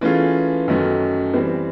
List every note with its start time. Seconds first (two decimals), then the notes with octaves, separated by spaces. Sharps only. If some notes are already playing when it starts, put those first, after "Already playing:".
0.01 E3 A3 C#4 F4 G#4
0.68 F#2 D#3 F#3 A3 C#4
1.33 E3 G3 C4